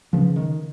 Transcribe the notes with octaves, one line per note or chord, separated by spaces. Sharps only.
C#3 F3
D#3